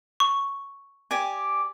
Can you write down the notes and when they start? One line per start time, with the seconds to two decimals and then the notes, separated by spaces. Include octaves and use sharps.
0.20 C#6
1.11 G4 D5 G#5